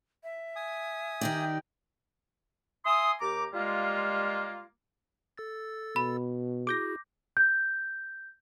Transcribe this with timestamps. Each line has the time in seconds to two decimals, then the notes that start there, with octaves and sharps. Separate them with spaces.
0.24 E5
0.56 G#5 D#6
1.21 D#3 D#4 G4 D5 G5
2.85 E5 G#5 C6 D#6
3.21 D#2 G4 A#5 D6
3.53 G3 G#3 A#3 F4
5.38 A4 E6 A6
5.96 B2 B5
6.67 E4 F#4 G#4 D6 G6 A#6
7.37 G6